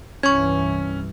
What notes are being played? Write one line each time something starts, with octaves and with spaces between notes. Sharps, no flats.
C2 G2 E3 C#4 C#6 G#6